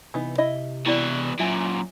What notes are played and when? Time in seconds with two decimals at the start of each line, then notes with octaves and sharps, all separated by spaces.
0.14 C3 E3 B3 D#4
0.38 E4 D#5 E5
0.86 B2 E3 C4 E4 D5
1.39 F#2 A#2 F#3 F4 E5 G#5